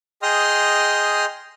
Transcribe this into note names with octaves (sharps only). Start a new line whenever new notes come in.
G#4 D#5 G5 C6 D#6 F6